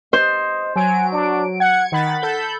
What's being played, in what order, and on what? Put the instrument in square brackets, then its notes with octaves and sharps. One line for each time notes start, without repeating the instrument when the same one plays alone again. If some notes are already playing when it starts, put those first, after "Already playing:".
[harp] C5 [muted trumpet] D#5
[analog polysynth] F#3 D7 [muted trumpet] G#5
[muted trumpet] D4
[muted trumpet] F#5 [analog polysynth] G#6 C#7
[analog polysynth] D#3 B5 A6 [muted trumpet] F#5
[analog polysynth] A4 B5 G6